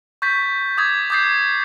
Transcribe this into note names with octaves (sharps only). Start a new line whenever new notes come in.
C#6 G6 A6 B6
D6 D#6 G#6 A6
D6 D#6 G6 A6 C7